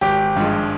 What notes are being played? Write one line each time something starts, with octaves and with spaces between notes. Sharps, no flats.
G#1 G4
G2 F3 G#3